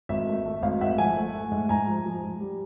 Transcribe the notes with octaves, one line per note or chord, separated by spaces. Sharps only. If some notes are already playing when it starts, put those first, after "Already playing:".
G#1 E5
A3
A3
G#1 F5
G#2 E5 F#5
F3 F#5 G#5
A3
A3
G#2
G#2 G#5 A#5
F3
F3
G#2
G3